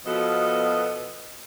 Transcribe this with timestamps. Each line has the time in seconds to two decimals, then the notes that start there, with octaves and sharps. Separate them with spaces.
0.05 B2 F3 B3 F#4 A4 D#5